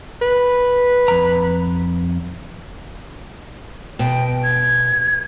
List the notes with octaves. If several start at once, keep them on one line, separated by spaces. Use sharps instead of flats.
B4
F2 A#5
B2 G5
G#6